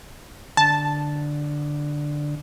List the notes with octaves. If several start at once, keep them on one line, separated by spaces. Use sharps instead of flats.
D3 A5